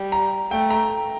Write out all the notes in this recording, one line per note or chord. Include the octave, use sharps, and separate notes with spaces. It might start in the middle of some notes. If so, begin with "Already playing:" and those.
Already playing: G3
A#5
A3 G5
A#5